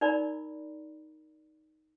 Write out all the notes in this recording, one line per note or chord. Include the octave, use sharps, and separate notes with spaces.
D#4 A#4 D5 A#5 B5